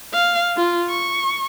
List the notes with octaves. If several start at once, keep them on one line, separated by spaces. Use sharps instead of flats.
F5
F4
C#6